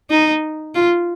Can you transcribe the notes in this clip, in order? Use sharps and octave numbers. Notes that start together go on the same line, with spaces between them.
D#4
F4